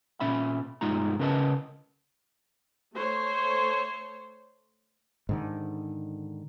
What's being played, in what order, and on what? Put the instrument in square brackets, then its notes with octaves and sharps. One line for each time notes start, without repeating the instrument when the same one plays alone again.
[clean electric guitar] A#2 C#4 E5 B5
B1 G2 G#3 D#4 F4 A#5
C#3 C#4 A#4 B4 D#5 A5
[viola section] A3 C5 C#5
[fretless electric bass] G#2 D3 D#3